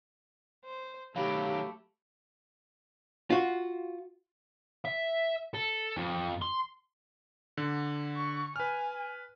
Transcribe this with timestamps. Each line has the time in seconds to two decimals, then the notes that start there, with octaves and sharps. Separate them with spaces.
0.65 C5
1.16 D#3 F#3 A3 G4 F5 B5 D7
3.30 F4 F#4
4.85 E5
5.54 A4
5.97 F2
6.42 C6
7.57 D3
8.16 C#6
8.56 B4 G#5 F6